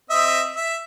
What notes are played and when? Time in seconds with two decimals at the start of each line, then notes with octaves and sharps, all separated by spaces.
0.10 C4 D#5 E5
0.56 E5